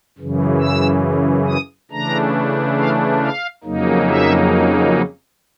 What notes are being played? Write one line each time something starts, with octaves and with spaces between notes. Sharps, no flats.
F#2 C#3 E3
E6
D#6
C#3 E3 A3 D4 A#5
F5
F5
F2 C#3 F#3 A#3 D#4
E5